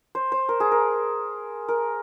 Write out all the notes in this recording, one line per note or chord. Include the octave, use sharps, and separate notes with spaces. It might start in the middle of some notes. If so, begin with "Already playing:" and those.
C5
C5
A#4
G#4
A#4
A#4